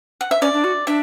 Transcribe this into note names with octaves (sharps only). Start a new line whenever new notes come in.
F#5
E5
C#4 D5
D4
F#4
D4 E5